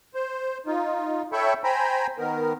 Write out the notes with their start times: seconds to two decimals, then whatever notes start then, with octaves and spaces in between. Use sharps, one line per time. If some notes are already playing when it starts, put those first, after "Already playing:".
0.14 C5
0.66 D#4 F4
1.33 A4 C#5 E5 G5 B5 C#6
1.64 C5 G5 G#5 A#5 B5
2.18 D#3 B3 A#4